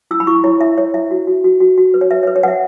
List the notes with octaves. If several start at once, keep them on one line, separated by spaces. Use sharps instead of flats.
E4 E6
B5
E4 C#6
E4 C#5
E4 E5
C#5
E4 E5
F#4
F#4
F#4
F#4
F#4
B4
C#5
B4 E5
C#5
B4
C#5
B4 E5 F#5